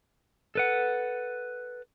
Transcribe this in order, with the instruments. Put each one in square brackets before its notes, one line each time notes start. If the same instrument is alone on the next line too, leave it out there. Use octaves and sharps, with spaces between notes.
[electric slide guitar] A4 B4 F#5